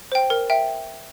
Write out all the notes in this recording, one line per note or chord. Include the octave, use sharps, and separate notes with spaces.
C5 G5
A#4
E5 G5